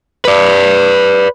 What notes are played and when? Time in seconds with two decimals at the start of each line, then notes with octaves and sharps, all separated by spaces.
0.25 B4 D5